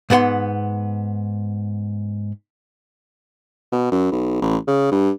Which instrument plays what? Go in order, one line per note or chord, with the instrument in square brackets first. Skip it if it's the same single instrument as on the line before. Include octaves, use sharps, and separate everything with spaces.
[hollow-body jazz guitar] G#2 B3 B4 F#5 C6
[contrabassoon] B2
F#2
B1
A1
C#3
G2